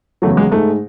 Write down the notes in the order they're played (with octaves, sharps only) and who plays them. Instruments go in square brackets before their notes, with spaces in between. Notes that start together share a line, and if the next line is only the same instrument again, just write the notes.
[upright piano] E2 C#3 F#3 A3
G#3
G#2 G#3 A3